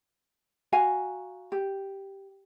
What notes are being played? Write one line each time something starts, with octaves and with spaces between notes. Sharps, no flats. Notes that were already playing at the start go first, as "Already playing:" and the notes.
F#4 F5 G#5 A#5
G4